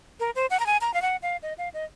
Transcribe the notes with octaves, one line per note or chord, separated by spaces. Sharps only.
A#4
C5
F#5
A#5
G#5
A#5
F5
F#5
F5
D#5
F5
D#5